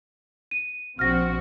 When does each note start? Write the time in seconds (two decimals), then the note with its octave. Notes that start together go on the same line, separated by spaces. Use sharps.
0.51 D#7
0.99 A#1 C4 F#4 F6 A#6